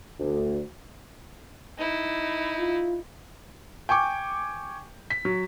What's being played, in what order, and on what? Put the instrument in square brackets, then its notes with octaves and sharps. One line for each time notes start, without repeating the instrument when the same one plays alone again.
[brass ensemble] D2
[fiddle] D#4 E4
[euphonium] F4
[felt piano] G5 G#5 C#6 D6
B6
F#3